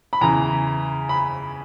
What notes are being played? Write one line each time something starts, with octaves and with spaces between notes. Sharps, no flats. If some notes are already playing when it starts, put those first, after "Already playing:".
B5
E2 C#3 E3 A#5
B5